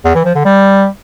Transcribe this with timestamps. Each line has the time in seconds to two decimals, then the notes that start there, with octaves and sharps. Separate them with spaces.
0.05 E2
0.15 E3
0.25 F3
0.35 D3
0.45 G3